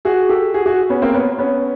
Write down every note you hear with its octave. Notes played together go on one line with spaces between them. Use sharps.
F#4 G#4
G4 A4
F#4 G#4
F#4 G#4
B3 C#4
A#3 C4
B3 C#4
B3 C#4